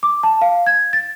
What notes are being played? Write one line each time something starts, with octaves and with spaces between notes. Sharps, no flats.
D6
A5
F5
G#6
A6